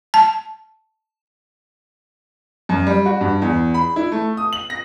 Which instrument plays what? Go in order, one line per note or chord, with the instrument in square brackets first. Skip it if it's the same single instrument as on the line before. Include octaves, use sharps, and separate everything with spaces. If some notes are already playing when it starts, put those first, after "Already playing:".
[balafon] A5
[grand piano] F#2
G3
F#4
G2
E2
B5
E4
A3
D#6
F#7
A#6